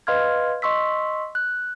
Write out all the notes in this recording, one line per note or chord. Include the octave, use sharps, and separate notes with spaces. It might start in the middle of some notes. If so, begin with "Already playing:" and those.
B4 D#5 F5 C6 F6 G#6
D#5 C6 C#6 E6 B6
F#6